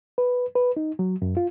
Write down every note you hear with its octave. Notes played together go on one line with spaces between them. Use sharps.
B4
B4
D#4
F#3
F#2
F4